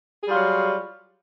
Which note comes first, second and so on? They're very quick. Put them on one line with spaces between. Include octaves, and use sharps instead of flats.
G#4 G3 F4 F#3